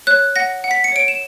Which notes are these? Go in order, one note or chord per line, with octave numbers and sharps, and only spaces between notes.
C#5 F#6
F#5 A#6
F#5
B6
C#7
C#5 D7
E7